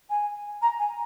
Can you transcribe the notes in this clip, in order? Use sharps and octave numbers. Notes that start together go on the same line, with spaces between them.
G#5
A#5
G#5